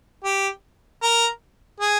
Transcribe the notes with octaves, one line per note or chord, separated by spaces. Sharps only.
G4
A#4
G#4